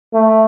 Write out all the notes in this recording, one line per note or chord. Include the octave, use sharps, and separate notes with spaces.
A3